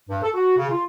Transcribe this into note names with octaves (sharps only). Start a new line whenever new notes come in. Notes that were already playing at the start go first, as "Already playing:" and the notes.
G2
A4
F#4
C#3
F4